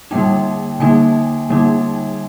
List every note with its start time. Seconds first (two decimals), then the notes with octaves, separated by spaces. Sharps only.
0.11 D3 G3 A#3 D#4 G5
0.80 D3 G3 A#3 D#4 G#5
1.50 D3 G3 A#3 D#4